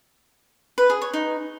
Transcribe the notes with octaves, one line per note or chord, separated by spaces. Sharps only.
B4
G#4
C#5
D#4